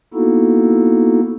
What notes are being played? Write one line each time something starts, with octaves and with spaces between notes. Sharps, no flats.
A#3 B3 D#4 E4 F#4 A4